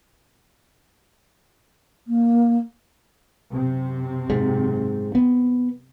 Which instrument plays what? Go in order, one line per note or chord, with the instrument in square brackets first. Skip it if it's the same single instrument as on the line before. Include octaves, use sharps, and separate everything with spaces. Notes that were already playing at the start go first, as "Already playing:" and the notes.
[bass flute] A#3
[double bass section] F#2 C3 C4
[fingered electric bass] G#2
B3